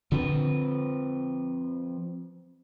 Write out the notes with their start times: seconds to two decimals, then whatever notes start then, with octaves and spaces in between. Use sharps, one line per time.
0.12 D3 F3 C4 B4